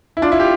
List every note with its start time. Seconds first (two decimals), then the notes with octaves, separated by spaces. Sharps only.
0.17 E4
0.22 D4 F4
0.32 E4
0.40 G4